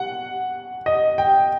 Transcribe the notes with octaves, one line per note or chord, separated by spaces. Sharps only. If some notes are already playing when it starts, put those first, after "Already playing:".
Already playing: F#5
D#5
G5